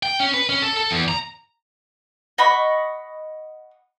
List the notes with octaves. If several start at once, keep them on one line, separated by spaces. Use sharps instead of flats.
G5
C#4
B4
C#4
A4
A4
E2
A#5
D#5 F#5 B5 C#6